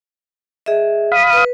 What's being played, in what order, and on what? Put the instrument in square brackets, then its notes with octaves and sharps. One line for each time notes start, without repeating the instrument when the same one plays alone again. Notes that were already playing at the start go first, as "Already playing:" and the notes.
[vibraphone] G#4 D#5 E5
[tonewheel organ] F5 B5 D#6
[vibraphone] B4